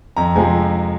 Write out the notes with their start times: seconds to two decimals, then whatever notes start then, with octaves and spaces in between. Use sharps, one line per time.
0.17 F2 A#5
0.35 C3 F3 G#3 G#5